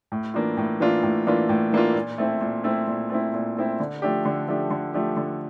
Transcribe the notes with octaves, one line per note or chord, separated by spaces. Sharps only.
A2
E3 A#3 D4 F4
A2
E3 A#3 D4 F4
A2
E3 A#3 D4 F4
A2
E3 A#3 D4 F4
A#2
A3 C4 E4
A#2
A3 C4 E4
A#2
A3 C4 E4
A#2
A3 C4 E4
D3
F3 A3 D4 G4
D3
F3 A3 D4 G4
D3
F3 A3 D4 G4
D3